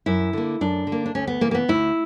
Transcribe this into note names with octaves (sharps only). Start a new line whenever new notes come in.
F#2 E4
D3 A#3
F#2 D4
D3
A#3
D4
D2 C#4
B3
C#3 E3 A#3
A#3
B3
D2 E4